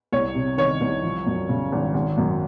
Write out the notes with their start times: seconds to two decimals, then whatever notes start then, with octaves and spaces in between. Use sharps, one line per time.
0.12 C2 C#5
0.35 C3
0.58 D#3 C#5
0.81 C2
1.03 F3
1.27 F#2
1.49 C#3
1.72 G#1
1.94 G#1
2.18 F#2